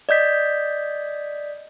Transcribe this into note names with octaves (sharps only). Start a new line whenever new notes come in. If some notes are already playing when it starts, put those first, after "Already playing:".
D5 D#5 G6 B6